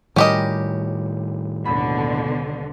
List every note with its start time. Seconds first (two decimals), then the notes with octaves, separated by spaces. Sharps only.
0.16 A2 D#3 G3 C#4 G4 A#4 D#5
1.65 D#2 B2 D3 B5